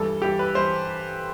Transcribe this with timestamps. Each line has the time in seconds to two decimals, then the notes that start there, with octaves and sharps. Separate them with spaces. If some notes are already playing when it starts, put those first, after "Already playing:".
Already playing: G2 E3 G3 A4
0.22 G2 E3 G3 G4
0.39 B4
0.55 E3 G3 C5